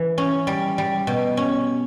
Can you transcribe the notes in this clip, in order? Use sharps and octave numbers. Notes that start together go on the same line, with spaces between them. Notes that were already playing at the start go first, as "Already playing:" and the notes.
Already playing: E3
C#4
G3
G3
B2
C#4